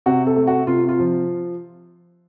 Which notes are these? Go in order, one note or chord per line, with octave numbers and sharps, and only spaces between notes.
C3 F#4
A4
A3
F#4
C3 F4
F4
F3